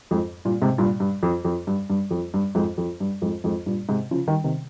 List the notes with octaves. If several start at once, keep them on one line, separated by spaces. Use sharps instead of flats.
F2 G#2
G2 A#2
G#2 C3
G2 A#2
G2
F2
F2
G2
G2
F2
G2
F2 G#2
F2
G2
F2 G#2
F2 G#2
G2 A#2
G#2 C3
C#3 F3
D#3 G3
C3 D#3